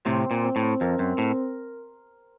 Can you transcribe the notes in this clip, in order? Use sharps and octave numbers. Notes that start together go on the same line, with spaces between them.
A2 C3 C4
C4
A#2
C4
A2
C4
F2 A#4
F#2 C4
A2 C4